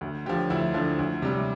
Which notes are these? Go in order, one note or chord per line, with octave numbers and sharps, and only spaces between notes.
D2
D3 F3 G4
D2 E4
D3 F3
D2
C3 G3